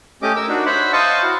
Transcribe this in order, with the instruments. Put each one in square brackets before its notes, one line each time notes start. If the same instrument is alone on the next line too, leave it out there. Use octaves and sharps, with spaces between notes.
[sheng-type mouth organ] A3 C#4 G4 D#5 D6
A#4 E6
D4 D#4 F#4
C5 C#5 E5 F#5 B5
C5 D#5 F5 A5 C#6
E4 F#4